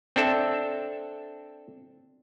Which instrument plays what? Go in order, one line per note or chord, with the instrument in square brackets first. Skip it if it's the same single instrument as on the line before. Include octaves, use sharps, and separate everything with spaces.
[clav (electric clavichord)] C4 D4 A4 E5